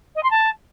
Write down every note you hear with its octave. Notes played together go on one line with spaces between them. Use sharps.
D#5
C6
A5